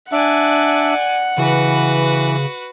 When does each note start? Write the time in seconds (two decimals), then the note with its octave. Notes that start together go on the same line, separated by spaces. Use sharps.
0.12 D4 D5 E5 F#5 G#5
1.38 C#3 E3 F#4 B4